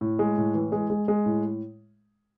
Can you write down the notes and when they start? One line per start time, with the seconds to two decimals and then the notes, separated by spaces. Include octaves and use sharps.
0.01 A2
0.19 G#3
0.38 A2
0.54 E3
0.72 G#3
0.90 G#3
1.08 G#3
1.26 A2